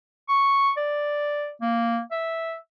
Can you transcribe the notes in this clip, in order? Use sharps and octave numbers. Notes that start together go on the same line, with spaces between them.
C#6
D5
A#3
E5